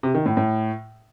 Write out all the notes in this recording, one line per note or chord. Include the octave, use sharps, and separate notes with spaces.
C3
D#3
A2
A2